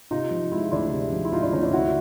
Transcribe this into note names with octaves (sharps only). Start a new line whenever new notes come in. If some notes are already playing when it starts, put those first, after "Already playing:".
C3 D#4 F4
F3
G#3 E4
F4
D2 D4 E4
C3
F3
E4
G#3 D#4 F4
D4 E4
D2 C#4 D#4
D4 E4
D3 E4 F#4